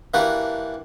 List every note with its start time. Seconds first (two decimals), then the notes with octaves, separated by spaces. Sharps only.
0.14 E3 A#3 D4 F#4 G4